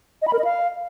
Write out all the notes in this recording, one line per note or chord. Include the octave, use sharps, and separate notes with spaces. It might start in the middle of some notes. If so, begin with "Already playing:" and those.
D#5
B5
A#4
D#5
F5